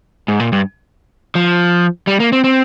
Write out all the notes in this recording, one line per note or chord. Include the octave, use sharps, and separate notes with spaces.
G#2
A#2
G2
F3
G3
A#3
C4
C4